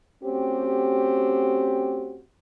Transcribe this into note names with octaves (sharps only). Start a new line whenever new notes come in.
A3 C4 C#4 F#4 G4